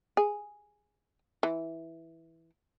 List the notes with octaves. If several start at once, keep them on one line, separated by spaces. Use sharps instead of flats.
G#4
E3